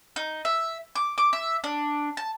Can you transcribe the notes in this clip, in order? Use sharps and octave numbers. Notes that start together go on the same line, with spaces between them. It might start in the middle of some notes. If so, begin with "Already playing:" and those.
D#4
E5
D6
D6
E5
D4
A5